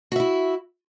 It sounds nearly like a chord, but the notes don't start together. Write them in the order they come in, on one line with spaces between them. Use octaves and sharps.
F#4 E5 E4